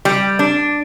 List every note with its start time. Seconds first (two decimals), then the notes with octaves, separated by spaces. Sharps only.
0.05 G3
0.39 D4